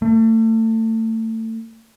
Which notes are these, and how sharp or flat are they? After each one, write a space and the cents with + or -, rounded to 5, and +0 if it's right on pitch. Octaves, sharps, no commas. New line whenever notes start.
A3 +30